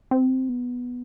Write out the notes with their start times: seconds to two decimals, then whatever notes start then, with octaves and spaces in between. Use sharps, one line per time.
0.11 C4
0.49 B3